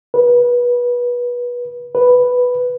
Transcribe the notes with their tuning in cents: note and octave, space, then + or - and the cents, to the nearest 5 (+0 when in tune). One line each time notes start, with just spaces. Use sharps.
B4 -25
B4 +0